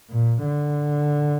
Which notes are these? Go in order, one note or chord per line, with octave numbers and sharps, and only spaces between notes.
A#2
D3